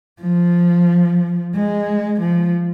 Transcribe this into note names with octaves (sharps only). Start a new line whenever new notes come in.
F3
G#3
F3